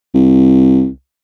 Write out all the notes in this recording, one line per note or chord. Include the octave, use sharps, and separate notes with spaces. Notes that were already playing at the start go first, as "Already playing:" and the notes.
C2